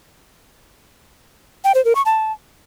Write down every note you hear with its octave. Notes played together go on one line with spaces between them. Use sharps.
G5
C5
A#4
C#6
A5